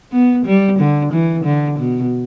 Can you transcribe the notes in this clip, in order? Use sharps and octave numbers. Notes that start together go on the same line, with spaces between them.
B3
G3
D3
E3
D3
B2